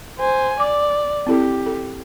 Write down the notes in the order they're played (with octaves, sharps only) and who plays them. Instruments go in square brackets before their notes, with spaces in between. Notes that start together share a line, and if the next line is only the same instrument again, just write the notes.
[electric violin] C5 G#5
[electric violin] D5 [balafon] D6
[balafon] C4 E4 A4 [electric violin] G4
[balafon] A4